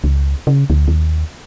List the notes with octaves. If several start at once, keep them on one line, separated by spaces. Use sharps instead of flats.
C#2
C#3
D2
D#2